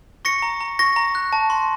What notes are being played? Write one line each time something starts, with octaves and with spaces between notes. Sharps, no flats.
C#6 A#6 C#7
A#5
A#5
C#6 A#6
A#5
F#6
A5
C6